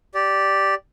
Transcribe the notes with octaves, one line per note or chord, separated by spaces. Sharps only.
G4 D5